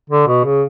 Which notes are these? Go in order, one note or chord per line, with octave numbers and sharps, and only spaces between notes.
D3
B2
C#3